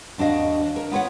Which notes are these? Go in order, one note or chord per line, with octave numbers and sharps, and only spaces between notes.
D#2 D4 F#4 D#5 F5
D4
A#4
B3 F4 C#5 F#5